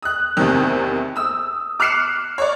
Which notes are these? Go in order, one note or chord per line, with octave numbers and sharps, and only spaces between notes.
D#6 F#6
E2 C3 D#3
D#6 E6
D6 F6 F#6 C7 C#7 E7
C#5 D5